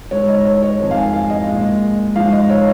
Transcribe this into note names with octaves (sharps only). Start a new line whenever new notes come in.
G#2 G#3 C#5
D#5
C#5
C#5
F2 D#3 G#3
F5
G#5
F5
D#5
A#2 G#3
G#2 F3 G#3 F5
D#5
C#5